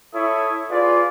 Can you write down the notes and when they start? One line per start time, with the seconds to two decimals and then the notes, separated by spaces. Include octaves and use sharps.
0.14 E4 A4 C#5 E5 D#6
0.71 F4 G#4 B4 D5